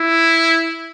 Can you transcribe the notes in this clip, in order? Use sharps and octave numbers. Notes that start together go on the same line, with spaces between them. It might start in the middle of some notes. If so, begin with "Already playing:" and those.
Already playing: E4